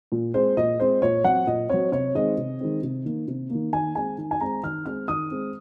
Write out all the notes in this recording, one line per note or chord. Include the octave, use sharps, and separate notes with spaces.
A#2
G#3 C4 C5
A#2 D#5
G#3 C4 C5
A#2 C#5
F#3 C4 F#5
A#2 D#5
F#3 C4 C#5
C3 C#5
D#3 G#3 C4 D#5
C3
D#3 G#3 C4
C3
D#3 A#3
C3
D#3 A#3
D#3 G#5
G#3 C4 G#5
D#3
G#5
G#3 C4 A#5
D#3 F6
G#3 C4 F6
D#3 D#6
G#3 C4